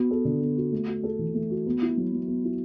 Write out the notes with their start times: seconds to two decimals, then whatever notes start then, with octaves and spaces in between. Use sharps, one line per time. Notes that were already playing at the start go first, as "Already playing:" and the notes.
Already playing: B3 F#4
0.11 A4
0.25 D3
0.41 B3
0.57 F#4
0.72 A3
0.87 F#4
1.03 A4
1.19 E3
1.34 A3
1.50 F#4
1.66 B3
1.82 E4
1.97 F#3
2.12 F#3
2.28 B3
2.44 E4